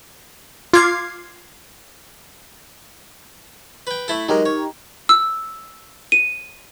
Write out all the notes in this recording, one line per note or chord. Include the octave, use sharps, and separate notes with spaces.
F4 D6 F6 G#6 C7
B4 G5
A3 E4 A4
F#3 G#3 D#4 G4 A#4
C#5
E6
D#7